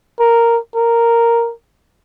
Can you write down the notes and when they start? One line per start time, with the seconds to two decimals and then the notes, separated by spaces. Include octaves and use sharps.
0.20 A#4
0.75 A#4